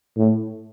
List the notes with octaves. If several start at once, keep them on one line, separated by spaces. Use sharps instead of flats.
A2